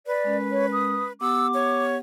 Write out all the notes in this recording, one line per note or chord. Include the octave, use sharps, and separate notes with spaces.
B4 D5
G#3 C#4 A#4
C#5
D#6
B3 G4 F#5 D6 E6
C#5